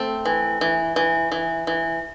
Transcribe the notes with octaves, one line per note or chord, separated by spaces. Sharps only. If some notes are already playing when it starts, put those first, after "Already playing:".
Already playing: A3 C4
E3
E3
E3
E3
E3